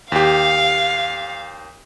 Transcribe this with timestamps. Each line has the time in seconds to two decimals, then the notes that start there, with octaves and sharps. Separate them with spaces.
0.12 D#2 G4 F5